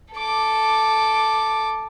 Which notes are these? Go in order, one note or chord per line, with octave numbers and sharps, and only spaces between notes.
A4 D6